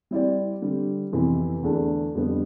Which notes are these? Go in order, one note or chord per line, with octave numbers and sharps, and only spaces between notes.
G3 C4 E4 G4 D5
D3 G3 C4
F2 C3 E3 B3
E2 D3 A3 D4
F2 D3 G3 B3